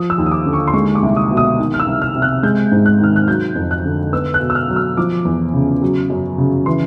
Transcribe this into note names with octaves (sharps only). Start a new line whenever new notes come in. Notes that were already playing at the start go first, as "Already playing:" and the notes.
Already playing: F3 D#6
E6
D#2
D#6
D6
D3
C#6
C6
G#3 C#6
D6
C2
D#6
B2
D#6
D#3
F6
E6
C2
F6
C3
F#6
G#3 G6
G#2
F#6
D#3 F6
F#6
F#3 G6
F2
F#6
D3
B3 E6
F#6
B2
E6
F6
F#3
E6
F3 D6
E2
C#3
F#3
F#2
C#3
E3 C6